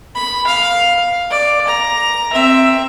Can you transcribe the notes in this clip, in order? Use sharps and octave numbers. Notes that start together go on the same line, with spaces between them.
B5
F5
D5
A#5
C4 E5